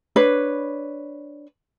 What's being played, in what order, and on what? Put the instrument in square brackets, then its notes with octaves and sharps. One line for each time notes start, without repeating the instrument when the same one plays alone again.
[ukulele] D4 B4 C#5